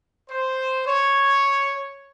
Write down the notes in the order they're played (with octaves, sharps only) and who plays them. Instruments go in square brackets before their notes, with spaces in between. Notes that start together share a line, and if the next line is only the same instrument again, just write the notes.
[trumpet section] C5
C#5